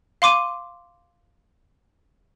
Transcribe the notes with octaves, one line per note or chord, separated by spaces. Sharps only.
F5 C6 D6 D#7